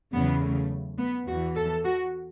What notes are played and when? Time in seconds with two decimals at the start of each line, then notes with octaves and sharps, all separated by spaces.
0.13 E2 C#3 F#3 B3
0.41 A3
0.99 B3
1.27 E2 E3 F#4
1.56 A4
1.84 F#4